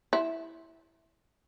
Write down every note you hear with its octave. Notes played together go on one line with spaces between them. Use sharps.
E4